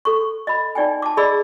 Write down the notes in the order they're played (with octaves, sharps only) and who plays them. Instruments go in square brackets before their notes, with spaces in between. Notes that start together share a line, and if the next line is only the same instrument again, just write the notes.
[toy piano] A4 C#6
D#5 B5
D#4 D5 G5 G#5
A5 D6
G#4 D5 D#5 B5 D6 E6